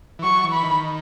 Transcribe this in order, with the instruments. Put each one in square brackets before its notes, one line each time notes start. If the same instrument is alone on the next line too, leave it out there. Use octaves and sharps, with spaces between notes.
[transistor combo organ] E3
[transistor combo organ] F#3 [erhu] C#6
[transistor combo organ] E3
[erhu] B5
[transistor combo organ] D#3